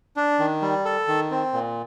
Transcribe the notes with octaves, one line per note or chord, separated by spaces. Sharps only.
D4
D#3
G3
A4
D#3
C4
A#2